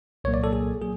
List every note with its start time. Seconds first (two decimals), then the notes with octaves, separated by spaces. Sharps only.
0.24 C2 A#2 F#3 A#3 C#5
0.34 D5
0.44 A4
0.53 G#4
0.82 F#3 A#3 G#4